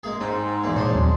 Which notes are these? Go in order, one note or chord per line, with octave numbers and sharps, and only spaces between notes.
G#3 A#3 G#4
G#2 C4
A#1 E2 A#3
A#2 G#3 D4 C5 C#5
D#2 F#3 C4